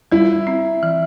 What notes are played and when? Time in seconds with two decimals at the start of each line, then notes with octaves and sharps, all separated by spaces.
0.12 G3 E4
0.47 C4
0.83 E3